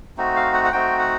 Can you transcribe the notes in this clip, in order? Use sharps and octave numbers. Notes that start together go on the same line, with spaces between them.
A3 C4 D#4 F#4
F5
F#5
F#5
A3 C4 D#4 F#4 G5
F#5